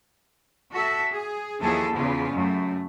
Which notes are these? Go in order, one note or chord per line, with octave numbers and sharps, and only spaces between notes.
F#4 A4 E5
G#4
D#2 E3 F3 G#4 A4
E2 C#3 F4
F#2 A3